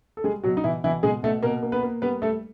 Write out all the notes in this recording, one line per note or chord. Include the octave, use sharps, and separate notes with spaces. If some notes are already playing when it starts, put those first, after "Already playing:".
A4
G3 G#3 G#4
B2 F#3 F#4
D#4
B2 E3 E4
B2 E3 E4
B2 G#3 G#4
B2 A3 A4
B2 A#3 A#4
A#3
B3 B4
A#3
G3 B3 B4
G3 A3 A4